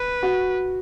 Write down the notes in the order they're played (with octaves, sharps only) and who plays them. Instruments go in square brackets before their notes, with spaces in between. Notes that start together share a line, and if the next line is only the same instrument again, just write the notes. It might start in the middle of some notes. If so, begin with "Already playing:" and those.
Already playing: [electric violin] B4
[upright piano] F#4